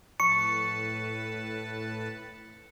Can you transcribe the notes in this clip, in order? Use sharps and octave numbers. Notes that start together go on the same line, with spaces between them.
A2 B4 A5 C#6 C#7